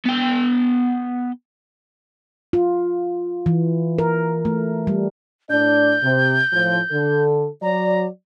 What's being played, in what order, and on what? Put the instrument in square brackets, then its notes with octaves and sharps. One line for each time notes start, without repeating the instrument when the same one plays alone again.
[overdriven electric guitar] B3 G5
[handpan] F4
E3
A#4
A3
G3
[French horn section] A2 D4 D5 [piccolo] G6
[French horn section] C3
A2 F3
D3 A4
[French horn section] F#3 D5 [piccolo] A#5